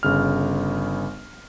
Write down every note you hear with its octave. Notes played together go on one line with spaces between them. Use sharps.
G1 C#3 F6